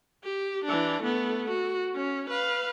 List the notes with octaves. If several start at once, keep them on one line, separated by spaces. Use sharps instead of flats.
G4
E3 D4
A3 B3
F#4
C#4
B4 F5